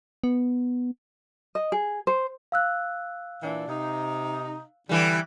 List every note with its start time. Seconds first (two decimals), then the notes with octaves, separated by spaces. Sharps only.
0.24 B3
1.55 D#5
1.72 G#4
2.07 C5
2.52 F5 E6 F#6
3.43 A#2 E3 D4
3.69 C3 D#4
4.89 D3 E3 G3